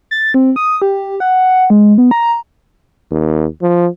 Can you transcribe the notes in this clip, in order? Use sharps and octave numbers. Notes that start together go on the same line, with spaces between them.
A6
C4
D#6
G4
F#5
G#3
B3
A#5
D#2
F3